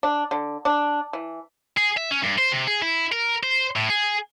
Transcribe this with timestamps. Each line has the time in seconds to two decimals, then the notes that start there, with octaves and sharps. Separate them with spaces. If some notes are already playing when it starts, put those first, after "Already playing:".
0.03 D4
0.31 D3
0.65 D4
1.13 E3
1.77 G#4
1.97 E5
2.12 C#4
2.23 G2
2.38 C5
2.52 C3
2.68 G#4
2.82 E4
3.12 A#4
3.43 C5
3.76 A2
3.90 G#4